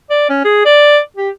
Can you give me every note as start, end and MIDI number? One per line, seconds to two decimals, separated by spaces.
0.10 0.27 74
0.29 0.41 61
0.45 0.65 68
0.66 0.99 74
1.16 1.29 67